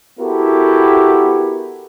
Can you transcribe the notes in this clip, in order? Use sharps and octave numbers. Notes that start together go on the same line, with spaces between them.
B3 E4 F#4 G4 A4 A#4